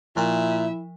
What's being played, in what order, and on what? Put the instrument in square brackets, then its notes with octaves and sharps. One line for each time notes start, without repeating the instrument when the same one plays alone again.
[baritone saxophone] A#2 [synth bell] F3 [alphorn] E4 [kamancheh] E5